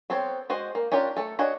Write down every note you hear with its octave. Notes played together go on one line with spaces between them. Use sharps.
B3 C4 A4 C5 C#5
G#3 F#4 C5 D#5
A#3
C#4 D4 F4 G4 A#4
A3 A4
D4 F#4 C#5 D#5 F#5